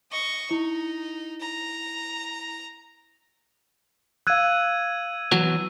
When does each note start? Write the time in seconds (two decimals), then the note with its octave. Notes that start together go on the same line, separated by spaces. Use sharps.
0.11 D#5 C#6
0.51 D#4 E4
1.40 A#5
4.27 F5 E6 F#6 G#6 D#7
5.32 E3 F#3 B3